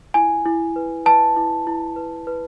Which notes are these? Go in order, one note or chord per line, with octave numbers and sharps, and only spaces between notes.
E4 G#5
E4
B4
B4 A5
E4
E4
B4
B4